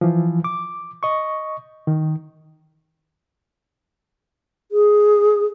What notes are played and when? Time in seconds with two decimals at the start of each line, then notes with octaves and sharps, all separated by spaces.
0.01 E3 F3
0.44 D6
1.03 D#5 C#6
1.87 D#3
4.72 G#4